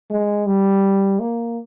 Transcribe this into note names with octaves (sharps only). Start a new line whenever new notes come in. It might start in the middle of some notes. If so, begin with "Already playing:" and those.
G#3
G3
A#3